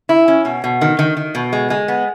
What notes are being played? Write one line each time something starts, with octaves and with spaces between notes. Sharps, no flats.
E4
C#4
B2
B2
D#3
D#3
D#3
B2
G#3
G#3
B3